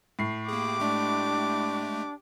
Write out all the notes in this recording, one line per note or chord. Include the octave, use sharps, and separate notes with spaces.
A2 C7
A#3 G4 G#4 D6
G#3 A3 D4